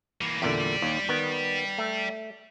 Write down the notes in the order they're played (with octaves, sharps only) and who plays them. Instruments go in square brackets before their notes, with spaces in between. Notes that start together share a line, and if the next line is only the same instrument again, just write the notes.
[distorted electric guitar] E3 A#3
[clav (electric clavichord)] E2 A#2 D3 [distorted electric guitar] G4 D5
[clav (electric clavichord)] D#2
D#3 B3
A3